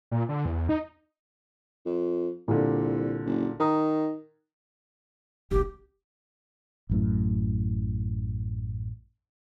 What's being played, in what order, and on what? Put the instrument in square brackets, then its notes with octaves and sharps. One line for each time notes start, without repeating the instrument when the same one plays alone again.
[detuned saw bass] A#2
D3
E2
D#4
[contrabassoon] F2
[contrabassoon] C2 [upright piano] A#2 D3
[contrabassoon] F#1
[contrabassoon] D#3 [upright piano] A#5 D#6
[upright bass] F#1 C2 [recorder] G4
[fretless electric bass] A1 F#2 A2